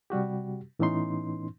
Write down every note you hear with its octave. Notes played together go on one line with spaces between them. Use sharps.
C3 G3 F#4 G4
A2 E3 B3 C#4 D#4 C6